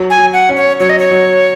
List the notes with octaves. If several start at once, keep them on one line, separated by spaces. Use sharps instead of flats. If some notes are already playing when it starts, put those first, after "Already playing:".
Already playing: F#3
G#5
F#3
F#5
C#4
C#5
F#3 C#5
D#5
C#5
F#3